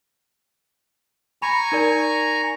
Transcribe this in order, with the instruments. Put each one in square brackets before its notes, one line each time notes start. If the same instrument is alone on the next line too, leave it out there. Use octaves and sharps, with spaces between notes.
[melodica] G#5 A#5 C#6 [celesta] B5 A#6
[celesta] D#4 A#4 D5